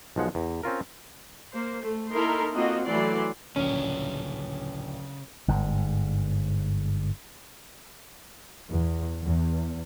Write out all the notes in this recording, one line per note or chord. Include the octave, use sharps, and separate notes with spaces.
B1 F3 G#3 F#5
E2
C4 C#4 F4 A#4
A#3 C5
A3
A#3 D#4 E4 A4 A#4 C6
A#3 C4 F4 F#4 D#5
E3 F#3 A3 D5 C6
D1 A#1 C#3 C#4 A#4
G1 G#2
E2
E2